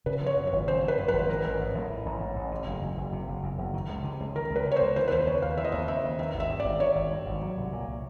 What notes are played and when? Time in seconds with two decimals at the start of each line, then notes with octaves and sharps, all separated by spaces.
0.06 C#3 B4
0.22 F3 C#5
0.37 F#2
0.47 C#5
0.53 G#1
0.67 C#3 C5
0.83 F3
0.88 B4
0.98 F#2
1.08 B4
1.13 G#1
1.29 E3 A#4
1.45 A1
1.59 G#2
1.74 A1
1.90 E3
2.06 A1
2.20 G#2
2.36 A1
2.52 C3
2.67 F#1
2.82 E2
2.97 F#1
3.13 C3
3.28 F#1
3.43 E2
3.58 F#1
3.74 D#3
3.89 C#2
4.04 C3
4.20 C#2
4.35 D#3 A#4
4.50 C#2
4.56 B4
4.66 C3
4.72 C#5
4.76 C5
4.81 C#2
4.96 E3 C5
5.08 B4
5.11 D#2 C5
5.27 C#3 C#5
5.42 D#2 F5
5.57 E3 E5
5.64 D#5
5.72 D#2 E5
5.88 C#3 E5
6.04 D#2
6.19 D#3 E5
6.34 G#1
6.40 E5
6.50 G2
6.60 D5
6.64 G#1
6.80 D#3 C#5
6.95 G#1
7.11 G2
7.26 G#1
7.42 F#3
7.57 C2
7.72 A#2